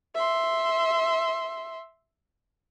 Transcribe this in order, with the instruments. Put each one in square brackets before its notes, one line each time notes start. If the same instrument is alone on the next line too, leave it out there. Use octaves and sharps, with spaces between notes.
[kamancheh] E5 C6